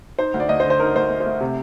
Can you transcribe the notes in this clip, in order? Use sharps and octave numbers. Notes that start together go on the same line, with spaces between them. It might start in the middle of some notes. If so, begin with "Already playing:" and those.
D#4 C5
D2
D5
D2 D#5
C5
D3
C5
D#4 A#4
D2 C5
A3
C5
A3
C3